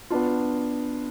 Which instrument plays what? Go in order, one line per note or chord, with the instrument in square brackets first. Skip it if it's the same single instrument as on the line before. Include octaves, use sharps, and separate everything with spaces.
[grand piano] B3 D4 F4